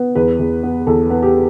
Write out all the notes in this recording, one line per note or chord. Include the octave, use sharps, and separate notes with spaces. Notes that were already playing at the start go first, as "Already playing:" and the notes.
Already playing: B3
E2 B4
E2
B3
E2 A4
B3
G4